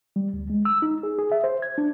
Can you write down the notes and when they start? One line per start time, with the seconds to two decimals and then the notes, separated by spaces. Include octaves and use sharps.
0.16 G3
0.33 D2
0.50 G#3
0.65 E6
0.82 D#4
1.03 G#4
1.18 G#4
1.32 E5
1.44 C5
1.62 G#6
1.78 D4